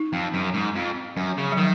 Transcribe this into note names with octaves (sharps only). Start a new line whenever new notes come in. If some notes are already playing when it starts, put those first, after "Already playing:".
Already playing: D#4
F2
F#2
G#2
F2
F#2
C#3
F#3
D#3 F3